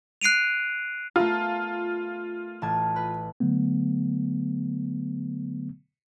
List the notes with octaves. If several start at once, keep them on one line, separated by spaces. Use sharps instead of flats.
F#6 C7 D7 D#7 F7
A3 B3 F4 A#4
A1 A5 G#6
B4
D3 F#3 A3 B3